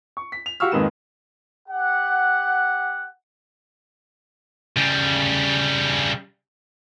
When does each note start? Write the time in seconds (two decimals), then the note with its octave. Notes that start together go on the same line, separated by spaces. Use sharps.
0.17 C#6
0.32 B6
0.46 F7
0.60 F#4 G4 F5 C#6 E6 F6
0.72 F2 G#2 D#3 A#3 B4 E7
1.68 G4 F#5
4.77 C#3 G3